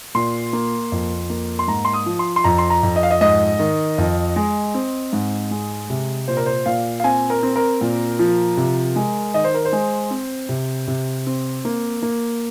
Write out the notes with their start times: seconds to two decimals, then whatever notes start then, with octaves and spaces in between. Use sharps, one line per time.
0.15 A#2 C6
0.53 A#3
0.92 F2
1.30 A#3
1.59 C6
1.68 G#2 A#5
1.85 C6
1.93 D#6
2.06 F3
2.19 C6
2.36 C6
2.44 F2 A#5
2.58 C6
2.70 A#5
2.83 F2
2.96 D#5
3.03 F5
3.11 D#5
3.21 G#2 D#5
3.59 D#3
3.98 F2
4.36 G#3
4.74 C4
5.13 G#2
5.51 G#3
5.90 C3
6.28 A#2 C5
6.37 A#4
6.46 C5
6.66 A#2 F5
7.00 F5
7.04 C4 G#5
7.30 A#4
7.43 C4
7.56 A#4
7.81 A#2
8.19 F3
8.57 C3
8.96 G#3
9.34 D#3 D#5
9.44 C5
9.54 A#4
9.65 C5
9.72 G#3
10.10 C4
10.49 C3
10.88 C3
11.26 C4
11.65 A#3
12.02 A#3